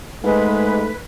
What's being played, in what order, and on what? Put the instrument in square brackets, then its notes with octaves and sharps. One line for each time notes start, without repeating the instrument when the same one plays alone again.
[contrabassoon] G#2 [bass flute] G#3 [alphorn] A3 [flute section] B4